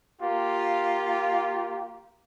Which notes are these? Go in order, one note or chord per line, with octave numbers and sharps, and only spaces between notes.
A#3 F4 G4